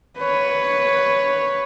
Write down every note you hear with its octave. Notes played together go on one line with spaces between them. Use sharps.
B4 C#5